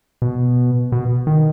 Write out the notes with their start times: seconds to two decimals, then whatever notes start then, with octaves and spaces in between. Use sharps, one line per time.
0.22 B2
0.92 B2
1.27 D#3